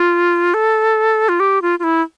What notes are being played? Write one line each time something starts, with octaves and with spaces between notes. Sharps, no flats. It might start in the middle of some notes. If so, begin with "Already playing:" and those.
Already playing: F4
A4
F4
G4
F4
F4
E4